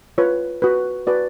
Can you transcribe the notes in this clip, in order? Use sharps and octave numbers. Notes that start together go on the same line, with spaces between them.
F4 B4 C#5
F#4 B4
F#4 B4 D5